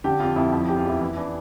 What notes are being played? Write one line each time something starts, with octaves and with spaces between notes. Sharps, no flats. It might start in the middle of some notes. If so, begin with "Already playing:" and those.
D3 G4
F2 F4
F2 E4
F3 E4
E2 G4
F4
E2 E4
E3 E4
E3 D4